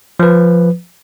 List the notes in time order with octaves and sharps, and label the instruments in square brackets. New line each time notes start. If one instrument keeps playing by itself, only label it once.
[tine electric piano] F3 B4